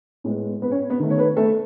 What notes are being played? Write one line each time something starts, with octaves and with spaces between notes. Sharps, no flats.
A2 G#3 B3
B3 B4
C#4 C#5
B3 B4
D#3 A3
C#5
B3 B4
A3 A4